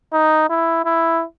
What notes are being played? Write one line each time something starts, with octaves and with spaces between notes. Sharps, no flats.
D#4
E4
E4